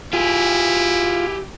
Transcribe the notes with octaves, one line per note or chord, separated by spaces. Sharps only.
E4 F4 G4 G#4